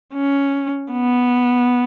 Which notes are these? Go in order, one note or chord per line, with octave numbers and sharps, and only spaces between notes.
C#4
B3